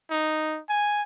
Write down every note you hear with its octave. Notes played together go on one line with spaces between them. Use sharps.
D#4
G#5